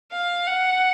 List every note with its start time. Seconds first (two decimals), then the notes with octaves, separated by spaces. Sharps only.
0.12 F5
0.47 F#5